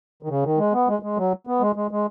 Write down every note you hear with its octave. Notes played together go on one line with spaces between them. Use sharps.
D#3
C#3
D#3
G#3
B3
G#3
G#3
F#3
B3
G#3
G#3
G#3